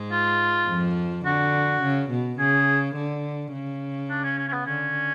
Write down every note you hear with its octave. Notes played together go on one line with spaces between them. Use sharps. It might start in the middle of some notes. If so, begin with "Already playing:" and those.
Already playing: G#2 G#3
F4
F2 F3
D3 F#4
C#3
B2
C#3 G#4
D3
C#3
D4
C#4
C#4
C#4
B3
D3 C#4